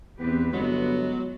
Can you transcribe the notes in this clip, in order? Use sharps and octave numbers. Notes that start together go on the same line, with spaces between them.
E2 B3 C4 G4 B4
G1 F#3 G#3 B3